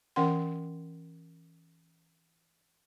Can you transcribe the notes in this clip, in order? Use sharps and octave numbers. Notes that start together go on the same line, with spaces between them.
E3 C#4 A#4 F#5 G5 C6